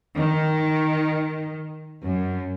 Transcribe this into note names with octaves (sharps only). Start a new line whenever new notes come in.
D#3
F#2